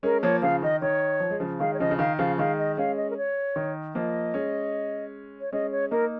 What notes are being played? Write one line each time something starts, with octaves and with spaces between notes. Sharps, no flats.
G#3 C#4 A#4
F3 A#3 C#5
C#3 F3 F5
D#3 D#5
D#3 C#5
F3
G#3
C#3 F3
D#3 G#3 F5
C#5
C#3 F3 D#5
C#3
D#3 F5
C#3 F3 F5
D#3 G#3 F5
D#5
G#3 C#4 F5
D#5
A#4
C#5
D#3
F3 A#3 D#5
G#3 C#4
C#5
G#3 C#4 D#5
C#5
A#3 D#4 A#4